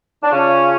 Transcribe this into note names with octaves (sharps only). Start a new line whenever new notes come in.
D4
C#3 C#4 F4